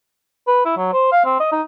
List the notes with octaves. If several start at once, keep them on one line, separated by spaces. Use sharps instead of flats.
B4
E4
F#3
C5
F5
C4
D#5
D#4